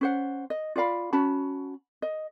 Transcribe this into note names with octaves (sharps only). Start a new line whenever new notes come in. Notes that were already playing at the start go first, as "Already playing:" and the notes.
C#4 C5 F#5
D#5
F4 D5 F5 B5
C#4 F#4 A5 B5
D#5